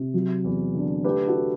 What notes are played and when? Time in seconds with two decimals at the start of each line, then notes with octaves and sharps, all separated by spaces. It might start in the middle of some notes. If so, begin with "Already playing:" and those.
Already playing: C3
0.14 F#3
0.44 E2
0.75 D3
1.04 A3 G4 B4
1.27 F#4 A4